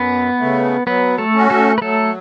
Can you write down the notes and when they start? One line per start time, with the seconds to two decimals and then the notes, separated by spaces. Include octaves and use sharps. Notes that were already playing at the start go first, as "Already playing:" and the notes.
Already playing: F#2 B3 B4
0.39 C#3 A3
0.87 F#3 B3 B4
1.18 A3 A4
1.35 C#4 F#4
1.50 A3 A4
1.78 B4
1.82 F#3 A3 A4